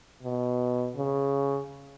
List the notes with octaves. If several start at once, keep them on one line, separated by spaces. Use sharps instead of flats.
B2
C#3